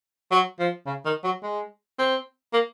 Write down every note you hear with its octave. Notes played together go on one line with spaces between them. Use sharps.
F#3
F3
C#3
D#3
F#3
G#3
C4
A#3